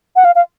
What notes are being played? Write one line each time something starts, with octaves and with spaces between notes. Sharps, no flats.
F#5
F5
F5